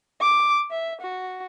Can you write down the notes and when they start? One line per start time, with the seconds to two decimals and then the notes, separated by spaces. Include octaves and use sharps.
0.21 D6
0.71 E5
1.01 F#4